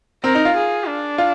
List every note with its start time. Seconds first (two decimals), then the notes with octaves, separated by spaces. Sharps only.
0.24 C4 A#4
0.35 D#4
0.45 F4
0.56 G#4
0.87 D4
1.18 F4